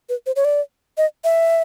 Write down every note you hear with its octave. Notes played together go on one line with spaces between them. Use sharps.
B4
C5
C#5
D5
D#5
E5